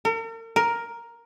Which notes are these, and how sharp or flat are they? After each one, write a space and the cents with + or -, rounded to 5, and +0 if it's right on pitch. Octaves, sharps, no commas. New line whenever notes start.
A#4 -45
A#4 +5